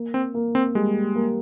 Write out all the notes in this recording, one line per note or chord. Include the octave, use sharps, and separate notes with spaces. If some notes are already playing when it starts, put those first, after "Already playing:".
Already playing: A#3
C4
A#3
C4
G3 G#3
A#3